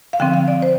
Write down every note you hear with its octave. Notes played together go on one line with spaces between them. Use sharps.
F5
D3 F3 C4 G5
F5
D5
C5